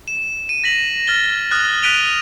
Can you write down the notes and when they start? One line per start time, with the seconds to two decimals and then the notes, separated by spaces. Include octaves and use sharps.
0.08 E7
0.49 D#7
0.64 A#6 B6 F#7
1.07 F6 A6 G7
1.51 D#6 F6 F#6 A6
1.82 F#6 B6 D7 D#7 F7 G7